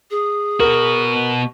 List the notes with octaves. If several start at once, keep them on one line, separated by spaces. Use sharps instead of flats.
G#4
B2 F#4 A#4